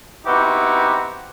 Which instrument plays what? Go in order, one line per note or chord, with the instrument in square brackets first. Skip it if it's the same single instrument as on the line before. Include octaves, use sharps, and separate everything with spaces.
[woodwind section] B3 C4 D#4 E4 F#4 G4